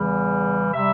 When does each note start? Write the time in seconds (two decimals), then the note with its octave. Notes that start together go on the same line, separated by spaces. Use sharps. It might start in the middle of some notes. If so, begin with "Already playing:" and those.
Already playing: E2 C#3 E3 G3
0.73 C3 G3 E5